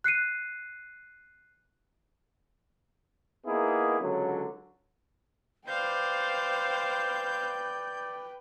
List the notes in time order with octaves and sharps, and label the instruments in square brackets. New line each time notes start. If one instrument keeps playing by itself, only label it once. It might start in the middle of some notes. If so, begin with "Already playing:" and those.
[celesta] F#6 C7 C#7 D#7
[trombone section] A#3 B3 D#4 E4 G#4
C#2 D3 F#3
[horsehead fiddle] B4 G5 [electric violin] C5 F5 [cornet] D5 [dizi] G6